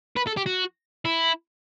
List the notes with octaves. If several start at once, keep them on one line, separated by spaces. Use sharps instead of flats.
B4
A4
G4
F#4
E4